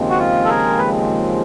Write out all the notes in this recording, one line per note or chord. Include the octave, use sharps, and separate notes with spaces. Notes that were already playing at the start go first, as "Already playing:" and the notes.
Already playing: D#2 C#3 F3 G#3 C4
F#4
F4
A4
G#4 A#4
B4